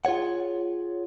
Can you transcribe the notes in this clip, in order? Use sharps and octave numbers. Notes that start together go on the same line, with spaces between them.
F4 G#4 C#5 F#5